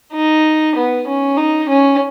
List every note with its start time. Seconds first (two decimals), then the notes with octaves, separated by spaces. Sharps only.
0.13 D#4
0.75 B3
1.07 C#4
1.37 D#4
1.69 C#4